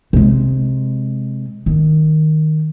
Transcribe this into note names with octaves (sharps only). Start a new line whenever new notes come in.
C3 G#3
D#3